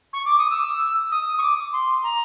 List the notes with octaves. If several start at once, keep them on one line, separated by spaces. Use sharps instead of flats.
C#6
D6
D#6
E6
D#6
C#6
D6
C6
A#5